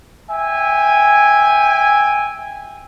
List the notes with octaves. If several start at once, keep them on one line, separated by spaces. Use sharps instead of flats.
E5 G5 G#5